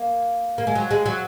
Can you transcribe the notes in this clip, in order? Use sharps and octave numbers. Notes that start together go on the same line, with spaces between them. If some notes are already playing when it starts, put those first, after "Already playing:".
Already playing: A#3
A#3
G#3
F#3
G#3
F#3